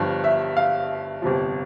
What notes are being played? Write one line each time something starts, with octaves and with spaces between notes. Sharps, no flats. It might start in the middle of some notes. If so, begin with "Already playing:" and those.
Already playing: G1 G2 F3
E5
F5
G1 F2 C3 F3